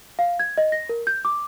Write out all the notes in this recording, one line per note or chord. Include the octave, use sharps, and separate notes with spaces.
F5
G#6
D#5
A#6
A#4
G6
D6